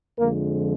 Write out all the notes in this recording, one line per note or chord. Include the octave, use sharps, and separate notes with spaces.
F2 D3 F3 G#3 A#3 A#4